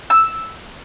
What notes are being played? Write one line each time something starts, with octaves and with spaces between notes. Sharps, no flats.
E6